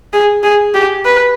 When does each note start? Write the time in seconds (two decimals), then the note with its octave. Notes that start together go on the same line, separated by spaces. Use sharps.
0.13 G#4
0.43 G#4
0.74 G4
1.05 B4